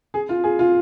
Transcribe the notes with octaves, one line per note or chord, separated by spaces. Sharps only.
G#4
F4
G#4
F4